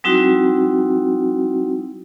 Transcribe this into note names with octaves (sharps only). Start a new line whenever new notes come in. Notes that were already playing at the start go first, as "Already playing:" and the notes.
F#3 G3 C4 D#4 E4 F#4